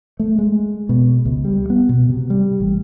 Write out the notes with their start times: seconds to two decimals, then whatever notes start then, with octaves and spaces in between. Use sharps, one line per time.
0.19 A3
0.38 G#3
0.89 B2
1.25 C#2
1.45 G3
1.70 B3
1.89 B2
2.09 C3
2.30 G3
2.60 A1